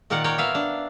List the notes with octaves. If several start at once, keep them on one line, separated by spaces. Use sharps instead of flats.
A#2 D#3 A#4 D5 F#5
A#4 C#5 D5 G5
B3 E5 F5
D4